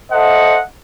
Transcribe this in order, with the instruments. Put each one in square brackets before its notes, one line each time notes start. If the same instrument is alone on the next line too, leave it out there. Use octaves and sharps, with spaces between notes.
[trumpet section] A4 C5 D#5 E5 F#5